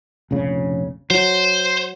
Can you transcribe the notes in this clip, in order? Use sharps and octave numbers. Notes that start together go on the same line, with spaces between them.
F1 A#1 C#3
F#3 C5